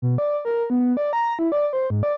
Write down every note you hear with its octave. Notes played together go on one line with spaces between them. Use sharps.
B2
D5
A#4
B3
D5
A#5
E4
D5
C5
G#2
D5